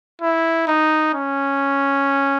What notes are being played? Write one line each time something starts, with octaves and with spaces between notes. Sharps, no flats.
E4
D#4
C#4